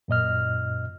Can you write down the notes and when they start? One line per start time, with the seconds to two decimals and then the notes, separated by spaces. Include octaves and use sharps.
0.08 F#2 A#2 D#5 F6